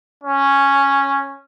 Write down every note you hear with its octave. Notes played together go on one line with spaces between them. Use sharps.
C#4